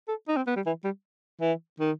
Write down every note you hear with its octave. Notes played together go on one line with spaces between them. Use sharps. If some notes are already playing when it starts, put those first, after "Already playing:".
A4
D#4
C4
B3
G3
E3
G3
E3
D#3